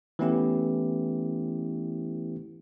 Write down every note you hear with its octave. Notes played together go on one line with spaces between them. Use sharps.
E3 A3 B3 C#4 E4 G4